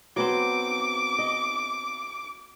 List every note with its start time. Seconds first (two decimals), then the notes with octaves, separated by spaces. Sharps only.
0.16 F#3 B3 C4 D6
1.19 D#5